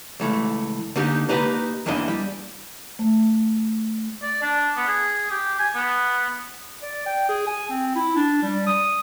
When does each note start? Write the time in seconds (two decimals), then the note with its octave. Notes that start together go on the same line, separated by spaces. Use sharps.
0.20 C#2 E3 A3
0.96 D3 A#3 D#4 G4
1.29 A#3 D#4 G4 B4
1.86 E2 E3 A#3 D4 D#5
2.08 G3
2.99 A3
4.23 D5
4.42 D4
4.77 B3
4.88 G#4
5.31 G4
5.59 G#5
5.75 B3
6.82 D5
7.06 G5
7.29 G#4
7.47 G#5
7.70 C4
7.95 E4
8.16 D4
8.42 G3
8.66 D#6